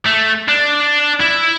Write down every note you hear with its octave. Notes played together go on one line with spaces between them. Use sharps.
A3
D4
E4